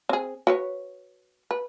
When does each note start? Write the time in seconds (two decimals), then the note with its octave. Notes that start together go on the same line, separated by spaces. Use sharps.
0.09 C4 G#4
0.47 F#4 B4 C#5
1.51 B4